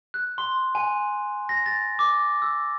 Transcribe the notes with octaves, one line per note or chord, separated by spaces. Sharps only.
F#6
C6
G#5
A#6
A6
D6
E6